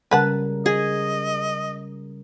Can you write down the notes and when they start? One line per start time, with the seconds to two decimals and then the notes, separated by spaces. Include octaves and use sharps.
0.11 C#3 G3 A#4 B4 F#5 A5
0.66 G#4 D#5